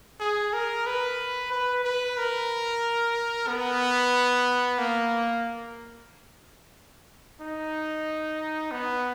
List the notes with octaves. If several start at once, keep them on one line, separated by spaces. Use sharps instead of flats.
G#4
A#4
B4
B4
B4
A#4
B3
A#3
D#4
B3